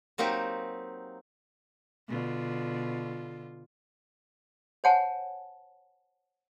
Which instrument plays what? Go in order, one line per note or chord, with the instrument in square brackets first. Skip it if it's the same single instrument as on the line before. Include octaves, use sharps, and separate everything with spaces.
[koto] F#3 A#3 C4 D#4 G4
[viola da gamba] B2 D3 F4
[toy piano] C5 C#5 F#5 G#5 A5